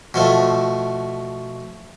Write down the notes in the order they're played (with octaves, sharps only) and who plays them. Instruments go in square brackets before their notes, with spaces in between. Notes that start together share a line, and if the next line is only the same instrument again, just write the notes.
[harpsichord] B2 F3 A3